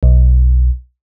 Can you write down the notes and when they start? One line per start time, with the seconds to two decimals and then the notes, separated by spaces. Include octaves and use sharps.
0.03 B1